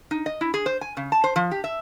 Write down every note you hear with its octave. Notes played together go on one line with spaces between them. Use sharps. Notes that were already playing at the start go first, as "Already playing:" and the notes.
D#4
D#5
E4
G#4
C5
G#5
C#3
A5
C5
F3
G4
E5